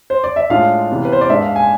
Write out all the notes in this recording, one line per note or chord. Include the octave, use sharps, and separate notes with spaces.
C5
D5
E5
A2 G#3 D4 F4 F5
C3 E3 B3
B4
C5
D5
G#2 G#3 D4 E5
F5
G#5